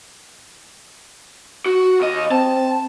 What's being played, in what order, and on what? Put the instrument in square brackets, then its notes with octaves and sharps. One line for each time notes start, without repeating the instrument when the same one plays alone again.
[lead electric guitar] F#4
D#2 D#5
[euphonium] C4 [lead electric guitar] A5